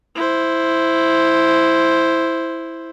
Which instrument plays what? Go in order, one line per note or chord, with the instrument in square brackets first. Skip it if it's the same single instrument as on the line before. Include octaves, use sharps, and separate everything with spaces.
[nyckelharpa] E4 C5